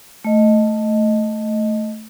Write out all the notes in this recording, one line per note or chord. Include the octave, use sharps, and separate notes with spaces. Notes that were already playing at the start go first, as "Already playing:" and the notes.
A3 D#5